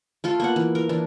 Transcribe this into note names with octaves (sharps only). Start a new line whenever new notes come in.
A3 F4 A4
A#3 B3 F#5
E3
A#4
E3 D4